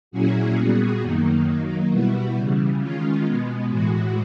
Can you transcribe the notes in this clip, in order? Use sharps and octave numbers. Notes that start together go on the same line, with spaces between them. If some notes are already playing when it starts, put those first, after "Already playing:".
A#2 F#3 A#3 C#4 E4 F#4 G#4
A#2 G3 B3 F#4 G#4
F#2 D#3 F#3 A#3 D#4
D#3 F#3 A#3 D#4
B2 G3 B3 E4 F#4
C#3 E3 G3
D#3 G#3 C#4 F4
B2 G#3 B3
A2 E3 G#3 F#4